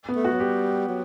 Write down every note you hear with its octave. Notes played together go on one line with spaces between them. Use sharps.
B3
A3
F#4
F#3
G3 G4
F#3